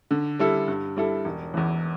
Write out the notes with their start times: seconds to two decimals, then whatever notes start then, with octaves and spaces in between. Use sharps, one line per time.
0.11 D3
0.39 G3 E4 A4
0.68 G2
0.97 G3 E4 A4
1.25 E1
1.54 E2 E3